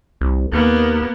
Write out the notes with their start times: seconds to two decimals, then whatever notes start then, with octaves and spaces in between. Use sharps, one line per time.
0.21 C2
0.52 D#2 A#3 B3